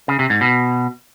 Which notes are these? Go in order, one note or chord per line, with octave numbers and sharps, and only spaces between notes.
C#3
C3
G#2
B2